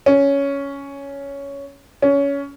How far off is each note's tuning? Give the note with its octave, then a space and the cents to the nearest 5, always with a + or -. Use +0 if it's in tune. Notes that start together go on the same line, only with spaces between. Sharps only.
C#4 +10
C#4 +20